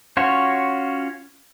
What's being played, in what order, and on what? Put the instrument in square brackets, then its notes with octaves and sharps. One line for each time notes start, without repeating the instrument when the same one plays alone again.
[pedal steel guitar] C#4 F4 F#4 C#5